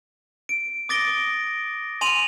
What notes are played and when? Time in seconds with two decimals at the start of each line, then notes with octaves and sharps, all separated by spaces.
0.49 D7
0.89 D6 D#6 A6 A#6 D7 G7
2.01 G#5 C6 D#7 F7 F#7